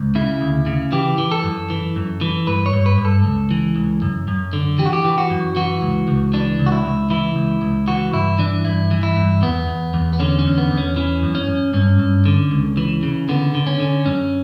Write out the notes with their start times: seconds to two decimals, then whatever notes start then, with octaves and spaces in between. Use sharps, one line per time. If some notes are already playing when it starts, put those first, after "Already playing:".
Already playing: C#2
0.15 C#3 E4
0.41 D2
0.66 C#3
0.92 E3 G4
1.18 E3
1.32 A4
1.43 F#2
1.70 E3
1.96 F#2
2.21 E3
2.47 G2 B4
2.66 C#5
2.73 G2
2.86 B4
2.98 G2
3.05 A4
3.24 C#2
3.51 E3
3.76 C#2
4.02 F#2
4.28 F#2
4.53 D3
4.78 E3 G4
4.85 F#4
4.93 G4
5.05 E3
5.18 F#4
5.30 F#2
5.56 E3 F#4
5.81 C#2
6.08 C#2
6.34 E3 D4
6.59 C#2
6.66 F#4
6.72 E4
6.85 C#2
7.10 E3 E4
7.36 C#2
7.62 C#2
7.88 E3 F#4
8.13 G2 E4
8.39 E3 D4
8.65 G2 E4
8.91 E3
9.03 E4
9.16 G2
9.42 E2 B3
9.68 E2
9.94 E2
10.13 B3
10.20 D3 C#4
10.39 C#4
10.45 E2
10.58 B3
10.71 E2
10.78 C#4
10.96 E3 C#4
11.23 F#2
11.35 C#4
11.48 F#2
11.73 G2 C#4
11.99 G2
12.26 D3
12.51 C#2
12.77 E3
13.03 C#3
13.29 D3 B3
13.55 D3
13.67 C#4
13.80 D3
14.06 F#2 C#4